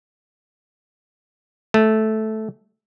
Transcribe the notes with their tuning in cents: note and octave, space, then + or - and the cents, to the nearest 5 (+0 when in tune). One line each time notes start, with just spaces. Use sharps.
A3 -10